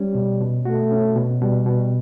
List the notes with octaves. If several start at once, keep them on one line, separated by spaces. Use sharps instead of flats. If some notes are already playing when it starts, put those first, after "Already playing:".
Already playing: G3 C#4
B2
B2
A3 F#4
C#4
B2
B2 G3
B2